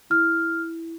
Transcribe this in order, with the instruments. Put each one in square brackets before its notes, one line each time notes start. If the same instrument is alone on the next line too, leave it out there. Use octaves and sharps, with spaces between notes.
[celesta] E4 F6